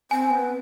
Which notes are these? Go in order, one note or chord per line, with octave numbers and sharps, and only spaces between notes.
C4 G#5
B3